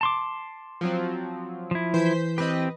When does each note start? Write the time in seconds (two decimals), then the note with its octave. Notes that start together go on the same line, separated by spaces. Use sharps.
0.01 A5 C6 D6
0.81 F3 F#3 C4
1.71 F3 E4
1.94 E3 C5 G6 B6
2.38 C4 G4 B4 D#5